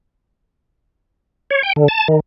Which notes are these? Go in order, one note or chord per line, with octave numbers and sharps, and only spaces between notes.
C#5
G5
D3
A5
D#3